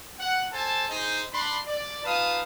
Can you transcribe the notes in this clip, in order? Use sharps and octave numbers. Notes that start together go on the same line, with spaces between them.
F#5
A4 C5 G#5 A5
D#4 G#4 C5
D4 B5 C6
D5
D#4 F4 B4 F5 A5 D#6